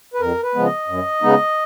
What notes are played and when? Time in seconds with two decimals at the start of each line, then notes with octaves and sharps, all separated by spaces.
0.14 B4
0.20 F2 A#4
0.43 B4
0.55 C#3 F3 G#3 B3
0.66 D#5
0.88 F#2
1.22 C#3 G#3 B3 D#4